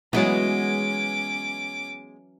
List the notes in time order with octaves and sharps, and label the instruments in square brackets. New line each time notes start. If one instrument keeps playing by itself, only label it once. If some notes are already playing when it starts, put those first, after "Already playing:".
[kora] E3 F#3 [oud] G#3 B3 [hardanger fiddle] C#4 D6